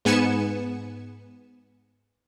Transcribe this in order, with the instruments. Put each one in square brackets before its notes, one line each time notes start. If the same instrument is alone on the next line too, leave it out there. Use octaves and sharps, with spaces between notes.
[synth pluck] G#2 B3 G#5 C#7 E7